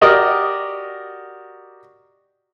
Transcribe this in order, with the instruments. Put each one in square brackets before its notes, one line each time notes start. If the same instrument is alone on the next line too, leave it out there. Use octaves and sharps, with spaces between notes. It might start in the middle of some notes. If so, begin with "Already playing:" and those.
[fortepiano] F#4 G4 A#4 D5 D#5